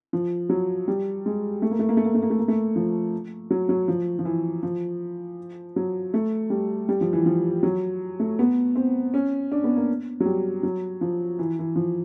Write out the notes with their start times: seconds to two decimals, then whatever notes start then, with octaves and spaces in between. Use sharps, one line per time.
0.13 F3
0.49 F#3
0.88 G3
1.26 G#3
1.62 A3
1.71 A#3
1.79 A3
1.89 A#3
1.97 A3
2.05 A#3
2.14 A3
2.22 A#3
2.30 A3
2.39 A#3
2.48 A3
2.76 F3
3.50 F#3
3.69 F#3
3.88 F3
4.19 F3
4.25 E3
4.63 F3
5.76 F#3
6.14 A3
6.50 G3
6.89 G3
7.01 F3
7.13 E3
7.26 F3
7.63 F#3
8.19 A3
8.39 B3
8.76 C4
9.14 C#4
9.52 D4
9.64 B3
9.76 A#3
10.20 F#3
10.26 G3
10.63 F#3
11.01 F3
11.39 E3
11.59 E3
11.76 F3